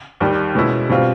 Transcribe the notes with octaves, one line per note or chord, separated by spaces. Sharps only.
D#2 D#3 G3
B2 G#3 C#4 E4
B2 G3 C4 F4